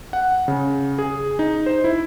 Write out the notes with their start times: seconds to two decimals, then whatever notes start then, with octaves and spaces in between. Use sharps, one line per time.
0.13 F#5
0.48 C#3
0.99 G#4
1.39 D#4
1.66 C5
1.84 E4